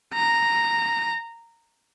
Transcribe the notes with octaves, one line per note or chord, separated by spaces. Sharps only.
A#5